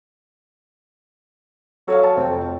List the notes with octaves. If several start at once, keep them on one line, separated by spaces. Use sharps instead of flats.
F#3 A4 C#5 F5
A5
F1 C4 G5
F2